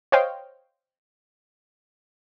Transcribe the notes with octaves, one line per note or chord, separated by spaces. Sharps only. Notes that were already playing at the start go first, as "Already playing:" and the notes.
C5 C#5 D#5 F5 G5